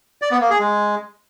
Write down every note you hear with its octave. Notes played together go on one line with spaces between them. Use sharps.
D5
B3
A#3
G#4
G#3